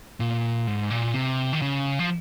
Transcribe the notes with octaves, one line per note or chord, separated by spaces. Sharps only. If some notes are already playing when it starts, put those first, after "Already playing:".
A#2
G#2
A#2
C3
D#3
C#3
F3